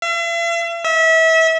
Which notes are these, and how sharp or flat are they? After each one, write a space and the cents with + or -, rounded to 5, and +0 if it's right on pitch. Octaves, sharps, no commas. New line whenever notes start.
E5 +45
E5 -30